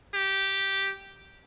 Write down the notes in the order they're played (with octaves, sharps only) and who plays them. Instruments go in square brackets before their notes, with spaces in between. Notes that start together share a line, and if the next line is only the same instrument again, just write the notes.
[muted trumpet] G4